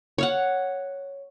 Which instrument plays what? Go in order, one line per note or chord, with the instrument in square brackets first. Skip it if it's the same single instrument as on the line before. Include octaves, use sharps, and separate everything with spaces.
[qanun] C#5 F5 F#5